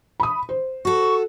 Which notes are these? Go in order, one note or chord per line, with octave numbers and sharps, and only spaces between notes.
B5 D#6
C5
F#4 A4 C#6